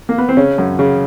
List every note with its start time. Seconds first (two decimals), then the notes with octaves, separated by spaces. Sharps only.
0.09 A#3
0.18 B3
0.29 C4
0.37 C#3 C#4
0.58 F#2
0.79 C#3